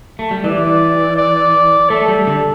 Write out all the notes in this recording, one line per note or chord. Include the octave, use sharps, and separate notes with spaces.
A3
G3
E3 D5
D5
A3 A4
G3
D3